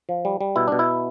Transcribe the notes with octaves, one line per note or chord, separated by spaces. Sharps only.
F3
G3
G3
B2 E4
B2 D4
E4